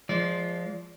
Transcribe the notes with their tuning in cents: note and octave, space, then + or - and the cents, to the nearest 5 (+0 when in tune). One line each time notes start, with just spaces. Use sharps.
F3 +0 G#3 +0 D5 -25